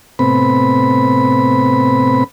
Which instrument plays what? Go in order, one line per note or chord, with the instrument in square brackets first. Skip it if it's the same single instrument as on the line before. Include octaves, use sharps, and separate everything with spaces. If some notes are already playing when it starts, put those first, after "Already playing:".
[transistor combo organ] A2 C3 B3 C4 B5